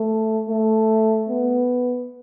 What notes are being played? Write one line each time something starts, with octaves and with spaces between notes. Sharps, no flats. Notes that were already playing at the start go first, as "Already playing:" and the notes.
Already playing: A3
A3
B3